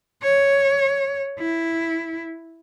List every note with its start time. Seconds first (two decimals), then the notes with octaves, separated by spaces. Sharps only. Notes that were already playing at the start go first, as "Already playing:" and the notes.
0.23 C#5
1.39 E4